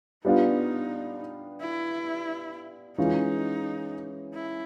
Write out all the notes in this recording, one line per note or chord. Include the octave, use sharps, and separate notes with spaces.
G3 B3 D4 D#4 F4
E4
E3 G#3 C#4 D#4 F4
E4